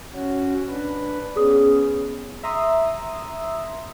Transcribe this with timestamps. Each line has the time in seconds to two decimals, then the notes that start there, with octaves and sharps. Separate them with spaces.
0.13 C#4 F#4
0.69 D4 B4
1.36 B3 C#4 G#4 D#6
2.43 E5 A#5 C6 D#6 E6